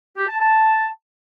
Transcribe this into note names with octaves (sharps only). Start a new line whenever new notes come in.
G4
A5
A5